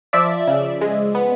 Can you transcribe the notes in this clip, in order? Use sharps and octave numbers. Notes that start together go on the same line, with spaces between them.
F3 D5 E5
C#3
G#3
B3